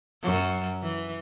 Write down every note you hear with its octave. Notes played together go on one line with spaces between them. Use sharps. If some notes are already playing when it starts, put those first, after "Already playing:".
F#2
E3